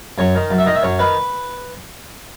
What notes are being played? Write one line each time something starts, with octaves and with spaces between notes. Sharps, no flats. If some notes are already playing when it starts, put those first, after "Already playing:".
F#2 C#5
D#3
F#2
E5
D#3 D#5
E5
F#2 C#5
D#3 B4